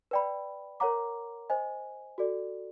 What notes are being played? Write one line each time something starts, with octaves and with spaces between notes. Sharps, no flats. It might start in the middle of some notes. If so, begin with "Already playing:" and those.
B4 D5 G5 B5
A#4 C#5 F#5 A#5 D6
C5 D#5 G#5
F#4 A4 D5